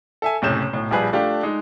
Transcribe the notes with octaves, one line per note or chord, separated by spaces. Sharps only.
A4 E5 G#5
F#1 A2 C3 C#4 G6 E7
B1 A2
A#1 F3 G3 G#4 B4 F#6
A3 D4 F4 G4
G#3 D#4